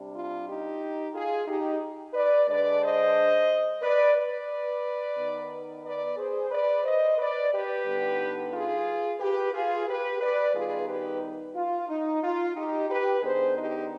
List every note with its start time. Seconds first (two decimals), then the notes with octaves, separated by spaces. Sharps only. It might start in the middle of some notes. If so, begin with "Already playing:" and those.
Already playing: C3 G3 D4
0.13 F4
0.46 D#4 G4
1.13 F4 G#4
1.47 D#4 G4
2.14 B4 D5
2.48 D3 G#3 D4 B4 D5
2.82 C5 D#5
3.82 B4 D5
4.16 B4 D5
5.17 D#3 B3 D#4
5.84 B4 D5
6.17 G#4 C5
6.51 B4 D5
6.84 C5 D#5
7.18 B4 D5
7.52 G4 B4
7.86 D3 G3 B3 D#4
8.53 F4 G#4
9.20 G4 B4
9.53 F4 G#4
9.88 G4 B4
10.21 B4 D5
10.54 D#3 G3 B3 D#4 F4 G#4
10.88 G4 B4
11.55 F4
11.89 D#4
12.23 F4
12.56 D#4 G4
12.89 G4 B4
13.23 D#3 B3 D4 G#4 C5
13.56 D#4 G4